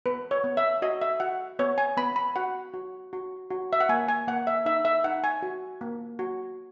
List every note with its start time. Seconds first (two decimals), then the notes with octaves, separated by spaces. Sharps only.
0.06 B3 B4
0.31 C#5
0.44 B3
0.57 E5
0.82 F#4 D#5
1.02 E5
1.20 F#4 F#5
1.59 B3 C#5
1.78 G#5
1.97 B3 B5
2.16 B5
2.36 F#4 F#5
2.74 F#4
3.13 F#4
3.50 F#4
3.73 E5
3.81 F#5
3.89 A#3 G#5
4.08 G#5
4.27 A#3 F#5
4.47 E5
4.66 D#4 E5
4.85 E5
5.04 D#4 F#5
5.24 G#5
5.42 F#4
5.81 A#3
6.19 F#4